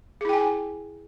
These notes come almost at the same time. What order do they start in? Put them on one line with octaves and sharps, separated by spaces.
G#4 E4 G5 G#5